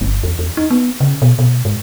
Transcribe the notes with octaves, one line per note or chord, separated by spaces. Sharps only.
G1
E2
E2
D#4
B3
C#3
B2
B2
G#2